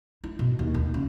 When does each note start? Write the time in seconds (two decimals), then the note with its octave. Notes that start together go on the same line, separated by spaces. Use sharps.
0.24 E4
0.39 B2
0.59 D#2
0.74 D2
0.94 C#3